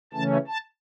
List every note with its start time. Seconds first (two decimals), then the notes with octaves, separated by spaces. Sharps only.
0.13 C#3 E3 A3 C#4 A5
0.48 A5